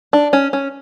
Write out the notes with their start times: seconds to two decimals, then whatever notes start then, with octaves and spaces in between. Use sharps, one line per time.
0.13 D4
0.33 C#4
0.53 C#4